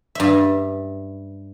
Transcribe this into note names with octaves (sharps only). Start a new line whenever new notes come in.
G2 E5